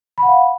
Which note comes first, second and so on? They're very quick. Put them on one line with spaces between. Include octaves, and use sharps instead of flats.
B5 F#5 F5